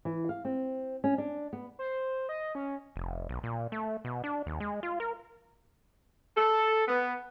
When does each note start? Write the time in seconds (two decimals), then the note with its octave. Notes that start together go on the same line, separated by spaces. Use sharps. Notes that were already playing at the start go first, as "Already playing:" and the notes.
0.05 E3
0.29 F5
0.45 C4
1.04 C#4
1.18 D4
1.53 B3
1.79 C5
2.29 D#5
2.55 C#4
2.96 F1
3.29 B1
3.43 A#2
3.72 A3
4.05 B2
4.24 D4
4.46 D#2
4.60 G#3
4.83 F4
5.00 A#4
6.36 A4
6.87 B3